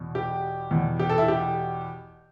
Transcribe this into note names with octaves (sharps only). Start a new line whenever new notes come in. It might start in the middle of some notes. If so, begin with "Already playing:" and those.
Already playing: E2 B2
G4
E2 B2
G4
A4
E4
G4